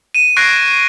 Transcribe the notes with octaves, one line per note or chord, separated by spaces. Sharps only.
D#7 E7
C#6 F#6 G#6 A#6 C7 D7